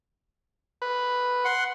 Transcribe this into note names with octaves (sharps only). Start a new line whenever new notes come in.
B4
F#5 C6